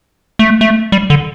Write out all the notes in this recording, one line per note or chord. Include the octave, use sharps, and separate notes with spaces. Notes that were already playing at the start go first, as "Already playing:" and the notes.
A3
A3
G3
D3